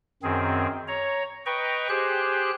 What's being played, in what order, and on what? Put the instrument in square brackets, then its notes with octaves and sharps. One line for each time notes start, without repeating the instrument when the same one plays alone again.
[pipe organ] F#2 D#3 C4 G#4
C#5 A#5
B4 D#5 G5 A#5 C#6
G4 G#4 C5 F#6